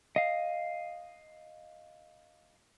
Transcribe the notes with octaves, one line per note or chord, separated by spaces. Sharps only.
D#5 F5